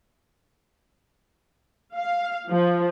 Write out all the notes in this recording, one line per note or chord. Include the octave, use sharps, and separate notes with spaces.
F5
F3